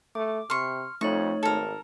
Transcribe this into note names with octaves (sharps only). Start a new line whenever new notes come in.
A3 D6
C3 C6 C#6 F6
F2 A3 D#4 C#5 C#6
G#1 A4 A#4